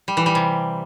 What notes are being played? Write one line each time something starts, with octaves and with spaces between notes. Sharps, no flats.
G3
E3
G3
C3